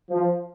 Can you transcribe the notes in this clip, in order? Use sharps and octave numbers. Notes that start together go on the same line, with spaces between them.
F3